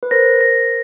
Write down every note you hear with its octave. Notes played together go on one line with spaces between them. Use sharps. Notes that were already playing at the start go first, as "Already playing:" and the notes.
B4
A#4 C5 A#6
A#6